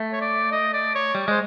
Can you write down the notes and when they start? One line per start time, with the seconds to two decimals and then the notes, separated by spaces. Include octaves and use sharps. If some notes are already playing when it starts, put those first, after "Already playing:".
Already playing: A3
0.13 C#5
0.21 D5
0.51 D#5
0.73 D5
0.95 C#5
1.15 G3
1.28 G#3 C5